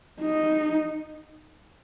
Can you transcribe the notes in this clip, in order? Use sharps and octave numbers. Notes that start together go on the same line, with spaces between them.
D#4